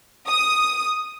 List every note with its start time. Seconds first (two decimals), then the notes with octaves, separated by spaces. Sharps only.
0.28 D#6